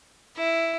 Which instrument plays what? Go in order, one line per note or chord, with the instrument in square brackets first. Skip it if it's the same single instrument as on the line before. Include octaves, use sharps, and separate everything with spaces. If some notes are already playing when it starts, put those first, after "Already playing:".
[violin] E4